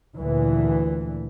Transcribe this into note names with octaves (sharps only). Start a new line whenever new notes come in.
D2 A#2 E3